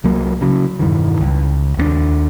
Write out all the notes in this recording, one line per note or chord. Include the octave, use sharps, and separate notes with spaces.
C2 F#3 A#3
C#3 F#3
E1 G2 D#3 E3
C#2
D#2 G#3 D4